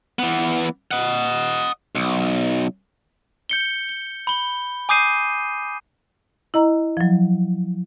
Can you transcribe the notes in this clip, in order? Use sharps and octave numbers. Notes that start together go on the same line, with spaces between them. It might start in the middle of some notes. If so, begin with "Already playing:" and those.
E3 B3
D#5 F#5
B1
G6 C#7 G7
G7
B5 G7
G#5 D6 D#6 G6 C7 D#7
E4 D#5 A#5
F3 F#3